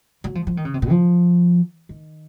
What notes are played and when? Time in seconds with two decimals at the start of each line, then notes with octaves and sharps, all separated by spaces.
0.24 F#3
0.35 F3
0.47 F3
0.57 D#3
0.65 C#3
0.74 C3
0.82 A#2
0.90 F3
1.89 D#3